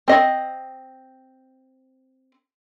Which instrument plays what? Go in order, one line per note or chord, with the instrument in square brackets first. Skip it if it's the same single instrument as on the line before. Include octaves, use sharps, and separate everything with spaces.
[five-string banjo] C4 D#5